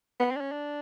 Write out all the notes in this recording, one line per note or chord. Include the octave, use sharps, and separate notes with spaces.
B3
C4
D4
C#4
D4